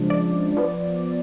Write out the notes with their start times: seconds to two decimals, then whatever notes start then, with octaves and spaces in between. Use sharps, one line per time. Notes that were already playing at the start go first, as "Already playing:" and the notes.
Already playing: C#3 F3 G#3 D4
0.10 D5
0.57 F3 B3